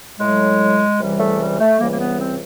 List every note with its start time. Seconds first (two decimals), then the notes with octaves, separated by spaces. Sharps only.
0.19 A2 F#3 G#3
0.99 C#2 C3 E3 G3
1.19 A3
1.40 G3
1.59 A3
1.79 C#2 C3 E3 G3 A#3
1.91 A#3
1.99 B3
2.20 C4